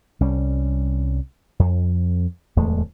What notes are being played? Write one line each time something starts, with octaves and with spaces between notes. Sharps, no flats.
C2 G3 C#4
F2
D1 E2 G#3 A3